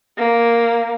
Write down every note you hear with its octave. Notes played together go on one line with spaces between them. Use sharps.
A#3